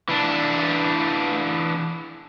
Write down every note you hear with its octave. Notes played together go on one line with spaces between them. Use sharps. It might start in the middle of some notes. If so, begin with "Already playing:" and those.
E3 D4